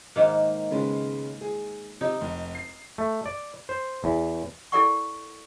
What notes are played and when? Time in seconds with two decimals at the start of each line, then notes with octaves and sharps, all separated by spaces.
0.16 G#2 D#3 A#3
0.71 C#3 G#3 B3
1.41 G#4
2.01 C3 D#4
2.21 F1
2.55 C7
2.98 A3
3.26 D5
3.69 C5
4.04 E2
4.72 E4 A4 A#4 D5 F#5 C#6